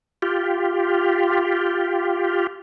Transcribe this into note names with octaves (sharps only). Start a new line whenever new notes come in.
F4 G4